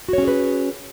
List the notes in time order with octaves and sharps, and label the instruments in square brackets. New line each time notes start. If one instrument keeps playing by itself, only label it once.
[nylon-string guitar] F#4
C#5
C#4
G#4
B4